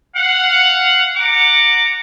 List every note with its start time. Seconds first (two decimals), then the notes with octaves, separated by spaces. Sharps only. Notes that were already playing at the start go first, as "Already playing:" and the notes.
0.14 F5 F#5
1.16 F#5 A#5 D6